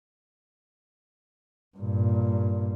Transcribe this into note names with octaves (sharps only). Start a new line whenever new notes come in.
G2 A#2